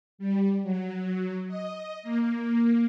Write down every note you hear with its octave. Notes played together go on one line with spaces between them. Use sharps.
G3
F#3
D#5
A#3